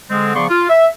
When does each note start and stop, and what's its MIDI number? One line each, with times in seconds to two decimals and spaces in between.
0.10 0.34 50
0.10 0.34 56
0.10 0.34 60
0.34 0.45 49
0.34 0.45 53
0.34 0.45 59
0.34 0.45 74
0.34 0.45 84
0.34 0.45 85
0.50 0.67 65
0.69 0.86 76